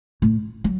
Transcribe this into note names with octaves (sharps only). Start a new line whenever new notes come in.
A2
F#3